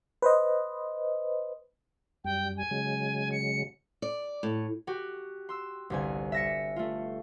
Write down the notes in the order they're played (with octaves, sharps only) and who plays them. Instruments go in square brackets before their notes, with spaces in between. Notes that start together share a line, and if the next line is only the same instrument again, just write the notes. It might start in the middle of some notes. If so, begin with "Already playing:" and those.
[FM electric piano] B4 C5 D#5
[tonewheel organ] F#2 G3 [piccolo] G5
[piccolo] G#5
[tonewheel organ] C#3 F#3 G#3
[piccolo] C#7
[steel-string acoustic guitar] D5
A2
[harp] F#4 G4
C6 E6
G1 C2 G#5
E5 A#6 C#7
A3 F4